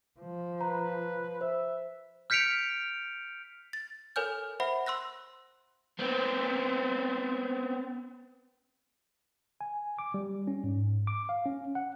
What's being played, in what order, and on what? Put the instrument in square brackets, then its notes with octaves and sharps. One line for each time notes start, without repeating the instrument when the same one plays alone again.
[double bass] F3
[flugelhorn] B4 [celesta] A#5
[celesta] C5 [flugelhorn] E5
[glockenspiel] F6 G6 B6 C#7 D7 F7
[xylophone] A6
A4 A#4 C#5 G#5 F6 G6
C5 E5 F#5 B5
C6 E6 F#6 A#6
[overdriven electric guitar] B3 C4
[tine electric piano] G#5
D6
G3
C#4
G#2
D6
F5
C#4
F#5